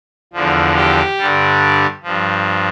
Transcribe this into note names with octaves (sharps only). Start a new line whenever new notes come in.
E2 D3 F3
G4
G2 D3 G3
G2 F3